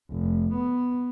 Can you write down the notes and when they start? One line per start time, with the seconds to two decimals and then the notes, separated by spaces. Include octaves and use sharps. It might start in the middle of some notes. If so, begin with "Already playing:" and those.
0.12 F1
0.54 B3